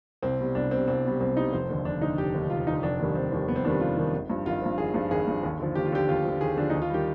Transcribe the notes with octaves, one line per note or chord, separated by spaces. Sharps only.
C2 C4
B2 G3
C2 D4
B2 G3 C4
C2 C4
B2 G3
C2 C4
B2 G3 D#4
F1 C5
D#2 D3
F1 D4
D#2 D3 D#4
F1 G4
D#2 D3
F1 F4
D#2 D3 D#4
F1 D4
D#2 D#3 G3
F1 C4
D#2 D#3 G3
F1 B3
C4
D#2 D#3 G3 D4
F1 F4
D#2 D#3 G3
G#1
G2 F3
G#1 F4
G2 F3
G#1 G#4
G2 F3
G#1 G#4
G2 F3
D#2
D3 F3
D#2 G4
F4
D3 F3 G4
D#2 F4
D3 F3
D#2 G#4
D3 F3 D4
D#2 D#4
F4
D#3 G3 G4